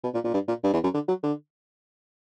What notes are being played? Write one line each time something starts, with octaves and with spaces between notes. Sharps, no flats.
B2
A#2
A#2
G2
A#2
G2
E2
F#2
D3
F#3
D3